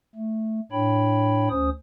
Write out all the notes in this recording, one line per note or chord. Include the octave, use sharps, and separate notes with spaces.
A3
A2 D4 C#5 G5 B5
D2 C#4 C5 D#6